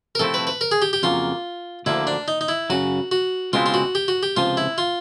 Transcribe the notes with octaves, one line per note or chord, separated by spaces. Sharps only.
A#4
C3 F3 A3 C4 E4 A4
B4
B4
A#4
G#4
G4
G4
F2 C#3 F#3 A#3 F4
D2 D3 F3 A#3 E4
D4
D#4
D#4
E4
F#2 C#3 F#3 F#4
F#4
C#2 B2 G#3 C4 E4 F4
F4
F#4
G4
F#4
G4
C#2 C3 F3 F4
E4
F4